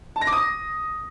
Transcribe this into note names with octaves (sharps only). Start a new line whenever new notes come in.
A5
A#6
D6
D#6